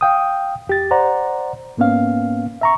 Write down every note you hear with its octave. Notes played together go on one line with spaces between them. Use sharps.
F5 G5 D#6
E2 G4 A6
C5 D5 F#5 A#5
G#2 A#3 B3 C#4 F5
E5 A#5 C#6